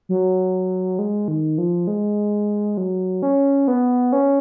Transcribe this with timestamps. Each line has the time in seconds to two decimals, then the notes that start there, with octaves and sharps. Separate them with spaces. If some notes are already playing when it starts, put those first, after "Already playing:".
0.09 F#3
0.99 G#3
1.28 D#3
1.58 F3
1.87 G#3
2.77 F#3
3.23 C#4
3.68 B3
4.12 C#4